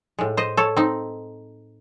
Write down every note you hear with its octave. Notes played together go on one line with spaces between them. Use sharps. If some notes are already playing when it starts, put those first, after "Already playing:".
A2 G#3
C5 D#5
A4 C#5
C4 D#4